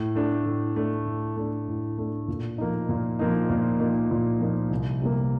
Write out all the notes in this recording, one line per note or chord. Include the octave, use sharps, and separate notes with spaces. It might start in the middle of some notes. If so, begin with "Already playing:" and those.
Already playing: A2
A3 D4
A2
A3 D4
A2
A3 D4
A2
A3 D4
A#2
F3 A#3 D#4
A#2
F3 A#3 D#4
A#2
F3 A#3 D#4
A#2
F3 A#3 D#4
C2
C3 G3 A#3